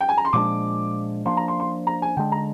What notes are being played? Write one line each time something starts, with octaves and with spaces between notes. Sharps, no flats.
G5
G#5
A#5
C6
A#2 F3 G#3 D4 D6
F3 A#3 D4 C6
A#5
C6
C6
A#5
G#5
D3 G#3 D4 G5
A#5